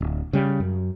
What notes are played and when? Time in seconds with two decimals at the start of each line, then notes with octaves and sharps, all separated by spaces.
0.01 D1
0.33 C#3 G3
0.60 F#2